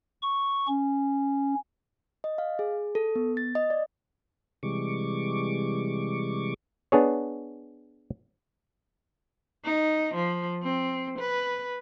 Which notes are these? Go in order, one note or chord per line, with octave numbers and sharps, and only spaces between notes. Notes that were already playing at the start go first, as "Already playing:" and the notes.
C#6
C#4
D#5
F5
G#4
A4
B3
A6
D#5
D5
C3 E3 G3 G#3 C#6 D6
B3 D4 G#4 C#5
D#4
F3
C4
B4